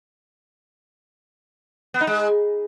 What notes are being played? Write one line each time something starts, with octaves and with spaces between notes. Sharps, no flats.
B3
D#4
G#3